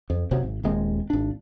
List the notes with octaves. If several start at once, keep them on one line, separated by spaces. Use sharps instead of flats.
F2
G1 C3 F#3
G#1
D#1 D#2 G#3 C4
G#1 D4